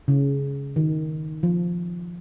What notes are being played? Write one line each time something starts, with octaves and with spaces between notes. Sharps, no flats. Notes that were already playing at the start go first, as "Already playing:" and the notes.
C#3
D#3
F3